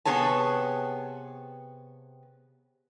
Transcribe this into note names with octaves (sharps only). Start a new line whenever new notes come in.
C3 B3 G#4 C#5 A5